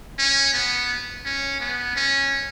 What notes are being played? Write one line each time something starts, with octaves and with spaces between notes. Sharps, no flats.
C#4
B3
C#4
B3
C#4